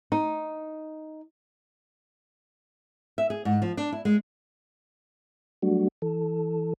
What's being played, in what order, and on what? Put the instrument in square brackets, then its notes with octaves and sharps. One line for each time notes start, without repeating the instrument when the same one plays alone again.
[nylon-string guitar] D#4
E5
G#4
G#2
F3
D4
E4
G#3
[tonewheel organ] F#3 G3 A3 D4 F#4
E3 A4